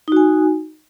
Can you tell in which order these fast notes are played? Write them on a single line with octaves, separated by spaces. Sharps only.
D#4 F#4 G#5